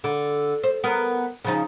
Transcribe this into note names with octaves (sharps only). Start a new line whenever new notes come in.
D3
C5
B3 A#4
C#3 F3 D#4